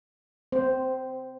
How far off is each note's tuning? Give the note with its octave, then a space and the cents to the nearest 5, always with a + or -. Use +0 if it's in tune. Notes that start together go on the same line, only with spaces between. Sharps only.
C4 -20 C5 +0